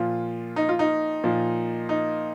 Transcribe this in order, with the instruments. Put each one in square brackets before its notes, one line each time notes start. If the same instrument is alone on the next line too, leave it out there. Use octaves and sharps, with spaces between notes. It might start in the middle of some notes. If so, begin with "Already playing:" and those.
Already playing: [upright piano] A#2 F3 F4
D#4
F4
D#4
A#2 F3
D#4